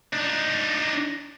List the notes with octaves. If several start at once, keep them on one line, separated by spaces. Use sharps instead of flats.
D4 D#4